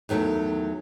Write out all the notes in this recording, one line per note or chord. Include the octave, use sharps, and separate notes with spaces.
E2 D#3 F#3 G3 A3